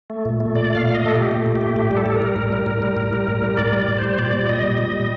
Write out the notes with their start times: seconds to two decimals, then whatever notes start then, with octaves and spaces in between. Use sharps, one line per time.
0.10 A3
0.25 A#2
0.40 A3
0.55 A#2 D5
0.70 A3 F5
0.85 A#2
0.95 D#5
1.01 A3
1.06 A4
1.16 A#2 G4
1.31 A3
1.46 A#2
1.55 G4
1.61 A3
1.76 A2 G4
1.91 G3
1.97 A4
2.06 A2
2.16 A#4
2.22 G3
2.36 A2
2.52 G3
2.66 A2
2.82 G3
2.97 A2
3.13 G3
3.28 A2
3.43 G3
3.57 A2 D5
3.73 G3
3.78 D5
3.88 A2
3.98 C5
4.04 G3
4.18 A#2 D5
4.33 G3
4.49 A#2 D#5
4.64 G3
4.78 A#2
4.93 G3